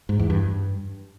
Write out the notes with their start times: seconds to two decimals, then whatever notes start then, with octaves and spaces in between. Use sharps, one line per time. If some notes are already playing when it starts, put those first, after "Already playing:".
0.09 G#2
0.19 E2
0.30 G2